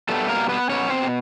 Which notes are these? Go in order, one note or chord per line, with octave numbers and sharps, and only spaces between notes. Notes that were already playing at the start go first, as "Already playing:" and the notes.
B2 G3 A3 B3 A4
A#3 A#4
B3 B4
B2 G3 B3 C#4 C#5
C4 C5